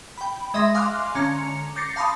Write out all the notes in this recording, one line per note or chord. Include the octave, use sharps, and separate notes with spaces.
G5 B5
G#3 D#5 E5 C6 D#6 A#6
F5 G#5 C6 D6 F6 F#6
D3 C#4 A#5 C#7
D6 G6 A6 A#6 C7 C#7
F5 A5 B5 C6 D#6